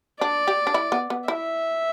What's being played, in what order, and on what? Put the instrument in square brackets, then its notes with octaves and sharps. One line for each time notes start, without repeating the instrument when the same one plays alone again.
[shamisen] D4 [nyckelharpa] D5
[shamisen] G4
D4
E4
B3
B3
[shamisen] E4 [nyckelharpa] E5